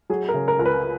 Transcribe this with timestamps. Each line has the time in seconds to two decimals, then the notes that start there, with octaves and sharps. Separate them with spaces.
0.10 F#3 G#4
0.29 A#4
0.34 C#3
0.48 A#4
0.59 C#2 A#4
0.66 B4